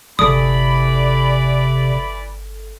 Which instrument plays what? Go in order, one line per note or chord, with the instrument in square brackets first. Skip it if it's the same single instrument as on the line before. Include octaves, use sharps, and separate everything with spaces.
[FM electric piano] G1 A4 [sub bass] C3 [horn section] E3 D5 B5 [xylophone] D#6